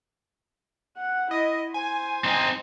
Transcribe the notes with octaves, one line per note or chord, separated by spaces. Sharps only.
F#5
E4 D#5
C5 G#5
C4 D#4